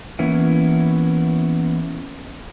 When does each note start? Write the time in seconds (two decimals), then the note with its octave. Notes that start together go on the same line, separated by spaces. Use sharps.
0.19 E3 A#3 B3 C#4 E4